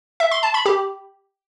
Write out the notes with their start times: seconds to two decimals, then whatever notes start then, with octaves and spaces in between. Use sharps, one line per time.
0.20 E5
0.31 C6
0.43 A5
0.54 B5
0.66 G4